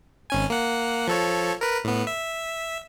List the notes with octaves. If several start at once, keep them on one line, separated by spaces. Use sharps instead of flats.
G#1 C#4 G#5
A#3 F#5
F3 A4 C#5
A#4 B4
A2 B3
E5